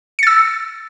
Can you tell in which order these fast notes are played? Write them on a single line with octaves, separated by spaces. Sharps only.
C#7 A6 E6